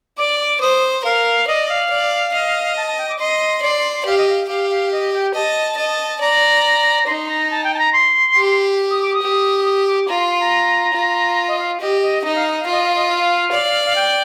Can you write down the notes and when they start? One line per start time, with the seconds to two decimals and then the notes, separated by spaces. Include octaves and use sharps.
0.18 D5 D6
0.40 D6
0.60 C5 D#6
1.04 A#4 F5
1.47 D5 D#5
1.69 F5
1.90 D5
2.34 D#5
2.76 A5
2.87 A5
2.98 G5
3.09 D6
3.19 D#5 C6
3.62 D5
4.05 G4 F5
4.17 D#5
4.29 F5
4.48 G4 F5
4.70 F5
4.92 D#5
5.13 G5
5.34 D#5 A5
5.77 D#5
6.21 D5 A#5
7.07 D#4 C6
7.28 A#5
7.50 A5
7.64 G5
7.74 A5
7.78 A#5
7.92 C6
8.35 G4
8.90 D#6
9.02 D6
9.13 D#6
9.21 G4
9.65 D#6
9.87 D6
10.08 F4 A#5
10.19 C6
10.29 C6
10.40 A#5
10.93 F4
11.48 D#5
11.59 F5
11.80 G4 D#5
12.02 D#5
12.23 D#4 D#5
12.35 F5
12.48 D#5
12.59 F5
12.66 F4
12.71 D#5
12.83 F5
12.96 D#5
13.09 F5
13.52 D5
13.85 F5
13.96 G5